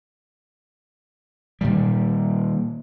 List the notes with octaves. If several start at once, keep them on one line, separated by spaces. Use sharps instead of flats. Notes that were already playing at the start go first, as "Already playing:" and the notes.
A#2 D#3 G3